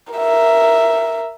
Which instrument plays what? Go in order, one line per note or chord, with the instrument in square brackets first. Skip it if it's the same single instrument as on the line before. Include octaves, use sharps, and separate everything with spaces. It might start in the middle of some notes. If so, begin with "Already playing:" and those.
[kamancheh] A#4 E5